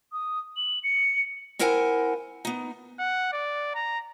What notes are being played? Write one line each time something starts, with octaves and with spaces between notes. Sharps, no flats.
D#6
F#7
C#7
C4 E4 A#4 C5 F#5 G#5
B3 D#4
F#5
D5
A#5